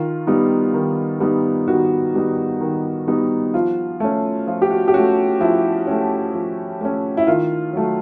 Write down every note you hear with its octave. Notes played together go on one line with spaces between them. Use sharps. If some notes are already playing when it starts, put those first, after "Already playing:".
Already playing: D#3 F4
G3 B3 D#4
D#3
G3 B3 D#4
D#3 F#4
G3 B3 D#4
D#3
G3 B3 D#4
F3 F4
A3 C#4
F3 F4
G4
F#4
G4
A3 C#4 F#4
F3 E4
A3 C#4
F3
A3 C#4
E4
D#3 F4
F#3 A3